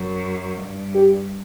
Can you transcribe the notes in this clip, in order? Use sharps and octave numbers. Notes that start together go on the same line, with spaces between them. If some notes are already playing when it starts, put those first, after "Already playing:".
Already playing: F#2
G2
G4